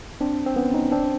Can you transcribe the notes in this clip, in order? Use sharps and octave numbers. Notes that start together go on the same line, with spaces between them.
C4 D4
C4
B3 C#4
C#4 D#4
C4 D4